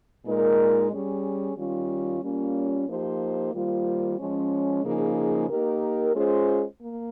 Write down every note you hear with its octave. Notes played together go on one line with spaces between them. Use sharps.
A#2 G#3 D#4 A#4
G3 C#4 G#4
D#3 G3 C#4 F4
G3 A#3 C#4 F4
F3 A#3 D#4 G4 C5
D#3 G3 A#3 F4 C5
F3 G#3 C#4
C#3 F3 A#3 D#4 G#4
A#3 D#4 G4 A#4
G#3 C#4 F4 G#4 C5
A#3